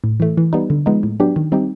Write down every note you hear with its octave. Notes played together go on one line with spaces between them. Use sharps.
A2
E3 A3
E3
G3 B3 D#4
D3
F3 G#3 B3 D#4
A2
F#3 B3 D4 G4
D#3
G3 C4 D#4 G4